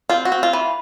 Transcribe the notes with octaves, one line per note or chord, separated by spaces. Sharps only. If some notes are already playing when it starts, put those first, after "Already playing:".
C4 F4
F#4
C4
F4
E3